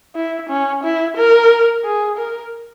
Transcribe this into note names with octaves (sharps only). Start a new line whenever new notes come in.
E4
C#4
E4
A#4
G#4
A#4